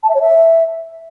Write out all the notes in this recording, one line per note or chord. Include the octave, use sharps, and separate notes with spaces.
A5
E5
C#5
E5